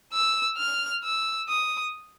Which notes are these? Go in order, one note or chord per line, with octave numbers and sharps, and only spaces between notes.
E6
F6
E6
D#6